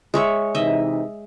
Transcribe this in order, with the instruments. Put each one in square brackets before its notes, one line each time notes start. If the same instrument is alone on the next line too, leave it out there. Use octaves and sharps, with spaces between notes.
[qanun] G#3 C#5 E5
[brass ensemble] C3 E3 D#4 [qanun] D#5 E5